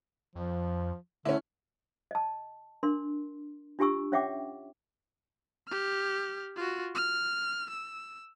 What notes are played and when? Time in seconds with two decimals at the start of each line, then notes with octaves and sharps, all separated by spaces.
0.35 F2 F3
1.25 D3 A3 C#4 E4
2.11 D#5 A5
2.83 D4 A#4 C6
3.79 D4 F4 G4 G#5 C#6 E6
4.12 C#4 C#5 E5 F#5 G5 D6
5.68 G4 F6
6.56 F4 F#4
6.95 F6
7.70 E6